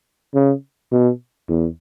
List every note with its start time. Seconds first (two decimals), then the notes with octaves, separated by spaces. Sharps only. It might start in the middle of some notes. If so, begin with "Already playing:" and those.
0.35 C#3
0.92 B2
1.49 E2